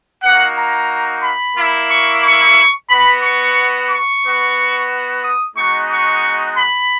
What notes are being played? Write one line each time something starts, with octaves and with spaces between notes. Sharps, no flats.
A#3 D#4 F#4 F#5
A#5
B5
A#3 E4
C#6
C#6
B3 F#4 B5
C#6
C#6
B3 F#4
D#6
G#3 B3 D#4 F#4 C#6
C#6
B5